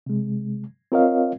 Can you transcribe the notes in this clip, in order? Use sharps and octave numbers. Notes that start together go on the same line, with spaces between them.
C3 G#3
C4 F4 A#4 C#5 D#5 F5